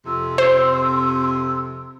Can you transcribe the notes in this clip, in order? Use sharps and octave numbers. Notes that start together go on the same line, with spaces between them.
F2 C3 C6 E6
C5